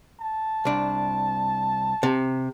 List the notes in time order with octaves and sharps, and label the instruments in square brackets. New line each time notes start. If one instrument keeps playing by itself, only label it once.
[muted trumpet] A5
[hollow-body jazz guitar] C2 D4
C3